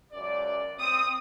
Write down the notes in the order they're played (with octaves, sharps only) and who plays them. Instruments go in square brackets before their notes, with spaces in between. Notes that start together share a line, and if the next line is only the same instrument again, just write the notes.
[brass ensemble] C#2 F#2 D5
[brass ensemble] C4 [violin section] D#6